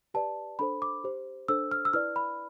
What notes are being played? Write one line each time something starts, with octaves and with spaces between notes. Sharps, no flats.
G4 B4 D5 A5
D4 A4 C5 B5
D6
G4 C5
D4 A4 C5 E6
F6
E6
E4 B4 D5 F6
B5